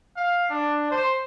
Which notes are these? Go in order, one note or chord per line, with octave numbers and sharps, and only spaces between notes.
F5
D4
C5